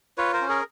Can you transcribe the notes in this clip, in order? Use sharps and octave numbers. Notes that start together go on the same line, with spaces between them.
F4 B4 C#5
A#4 C5
C#4
G#4 A#4